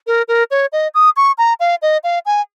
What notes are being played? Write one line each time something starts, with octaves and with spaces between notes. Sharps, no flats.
A#4
A#4
C#5
D#5
D#6
C#6
A#5
F5
D#5
F5
G#5